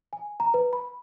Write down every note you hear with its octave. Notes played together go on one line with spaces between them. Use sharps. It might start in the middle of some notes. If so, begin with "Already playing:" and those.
G#5
A#5
B4
B5